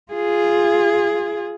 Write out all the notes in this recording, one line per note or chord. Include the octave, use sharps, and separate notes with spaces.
F4 G#4